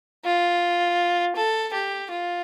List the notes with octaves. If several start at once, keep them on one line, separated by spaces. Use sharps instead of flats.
F4
A4
G4
F4